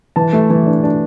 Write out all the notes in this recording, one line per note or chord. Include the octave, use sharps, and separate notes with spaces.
E3 A5
A3
E3
D4
D4